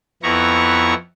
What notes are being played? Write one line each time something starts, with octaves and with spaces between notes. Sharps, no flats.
F2 B3 E4 A#5 C#6